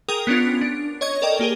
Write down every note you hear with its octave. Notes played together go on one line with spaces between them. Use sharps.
G#4 A#4 G5 D#6
B3 C#4 D4 F4
D4
C#5 D#5 C#6 G#6
A4 A#4 D5 D#5 G5
A#3 G4 G#4 A#4